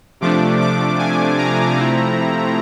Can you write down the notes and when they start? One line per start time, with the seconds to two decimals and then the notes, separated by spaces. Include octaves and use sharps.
0.21 C3 F3 A3 D4 D6
0.60 D6
0.99 G#5
1.38 A#5
1.77 C3 F3 A3 C4 E4